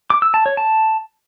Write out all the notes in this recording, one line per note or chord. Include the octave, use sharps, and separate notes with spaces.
D6
E6
A5
C#5
A5